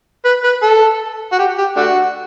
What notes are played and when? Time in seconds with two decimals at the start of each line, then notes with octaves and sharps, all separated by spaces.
0.25 B4
0.44 B4
0.63 A4
1.32 F#4
1.39 G4
1.58 G4
1.76 A3 D4 F#4